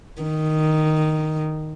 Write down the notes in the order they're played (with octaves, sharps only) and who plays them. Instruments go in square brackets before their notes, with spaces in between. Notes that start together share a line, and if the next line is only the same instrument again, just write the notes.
[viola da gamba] D#3